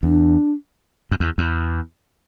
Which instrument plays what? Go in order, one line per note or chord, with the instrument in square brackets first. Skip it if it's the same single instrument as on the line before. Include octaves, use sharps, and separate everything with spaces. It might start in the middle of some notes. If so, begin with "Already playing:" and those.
[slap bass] E2 [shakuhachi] D4
[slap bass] F#2
E2
E2